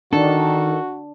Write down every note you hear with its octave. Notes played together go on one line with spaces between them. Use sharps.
D#3 D4 F#4 A4